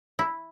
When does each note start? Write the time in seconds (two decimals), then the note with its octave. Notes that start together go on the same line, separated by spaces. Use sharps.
0.19 E4